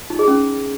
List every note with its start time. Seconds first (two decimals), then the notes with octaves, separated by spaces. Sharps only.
0.10 D#4
0.19 G#4
0.28 C#4